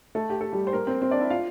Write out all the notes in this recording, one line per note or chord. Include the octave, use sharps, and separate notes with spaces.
A3 A4
G4
A4
G3 G4
C5
A#3 A#4
C4 C5
C4 C5
D4 D5
E4 E5
F4 F5